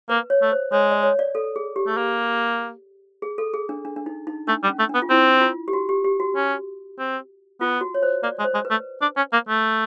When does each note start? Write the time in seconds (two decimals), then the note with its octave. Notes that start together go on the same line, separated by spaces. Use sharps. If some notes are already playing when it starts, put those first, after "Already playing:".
0.09 A#3 B4
0.30 C#5
0.41 A3
0.52 C5
0.72 G#3 C#5
0.92 D5
1.03 C#5
1.19 D5
1.35 A4
1.56 G#4
1.76 G4
1.86 A3
1.97 A#3
3.22 G#4
3.38 A4
3.54 G#4
3.69 D4
3.85 D4
3.96 D4
4.06 D#4
4.27 D#4
4.47 A3 D4
4.63 G3
4.68 C#4
4.79 A3
4.89 B3 D4
5.02 F4
5.10 C4 E4
5.41 F4
5.68 G4
5.73 F#4
5.89 G4
6.04 G4
6.20 F#4
6.35 C#4
6.98 C4
7.60 B3 F4
7.81 F#4
7.94 C#5
8.03 C5
8.23 A#3 D5
8.39 G#3
8.44 C5
8.54 G#3
8.65 B4
8.70 A3
9.01 D4
9.17 C#4
9.33 A#3
9.48 A3